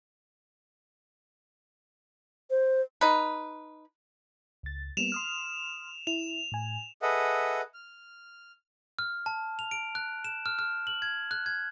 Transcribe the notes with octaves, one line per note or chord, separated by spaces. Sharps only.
C5
D#4 B4
C#2 A6
G3 A#3 B3 E7 F7
C6 D#6 F6
E4 F7
A2 G#5
G#4 A4 B4 D#5 E5 F#5
F6
F6
A5
F7
D7
F#6
E7
F6
F6
F#7
G#6
F#6
G#6